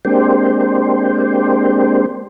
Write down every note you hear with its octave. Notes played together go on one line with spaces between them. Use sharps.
G#3 A#3 C4 D4 G4 C5